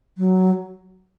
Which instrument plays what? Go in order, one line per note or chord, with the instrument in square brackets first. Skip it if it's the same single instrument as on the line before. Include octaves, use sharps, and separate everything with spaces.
[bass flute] F#3